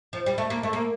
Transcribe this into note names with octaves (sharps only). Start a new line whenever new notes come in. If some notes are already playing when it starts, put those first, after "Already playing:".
F3
G3
A3
A#3
A3
A#3